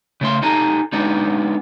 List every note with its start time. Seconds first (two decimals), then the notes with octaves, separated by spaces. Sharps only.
0.21 C#3 A3 C6
0.43 D#4 G4 A4 G#5 A#5
0.93 G#3 B3 D4 D#4